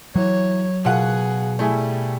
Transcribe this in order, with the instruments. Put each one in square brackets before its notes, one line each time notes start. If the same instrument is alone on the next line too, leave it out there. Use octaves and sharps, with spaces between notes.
[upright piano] E3 [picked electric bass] F#3 [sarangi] C#5
[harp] B2 [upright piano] F4 F#5 [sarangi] G#4
[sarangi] G3 [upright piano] A3 E4 G#4